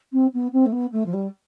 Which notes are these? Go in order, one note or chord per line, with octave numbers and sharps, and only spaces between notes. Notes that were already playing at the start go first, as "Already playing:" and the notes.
C4
B3
C4
A3
B3
A3
F3
G3